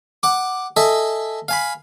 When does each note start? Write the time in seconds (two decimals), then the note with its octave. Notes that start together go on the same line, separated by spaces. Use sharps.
0.23 F#5 D6
0.76 A4 D#5 E5 G#5
1.48 F5 G#5 B5